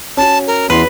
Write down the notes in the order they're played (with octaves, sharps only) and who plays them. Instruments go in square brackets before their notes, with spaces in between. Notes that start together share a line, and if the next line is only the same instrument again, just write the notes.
[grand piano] C#4 F#4 [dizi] A5
[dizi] A#4
[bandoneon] E2 [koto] B4 [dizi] C6